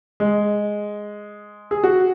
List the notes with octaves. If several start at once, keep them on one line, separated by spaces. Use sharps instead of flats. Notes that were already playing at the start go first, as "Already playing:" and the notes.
G#3
G#4
F#4